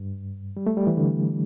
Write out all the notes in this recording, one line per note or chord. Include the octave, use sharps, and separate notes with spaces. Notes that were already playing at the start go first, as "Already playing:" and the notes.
Already playing: G2
G3
A3
G3
E3
D3